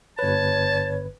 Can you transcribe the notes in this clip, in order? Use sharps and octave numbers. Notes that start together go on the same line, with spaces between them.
G1 B4 C#5 A5